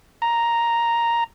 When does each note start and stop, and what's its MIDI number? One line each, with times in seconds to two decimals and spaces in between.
0.22 1.24 82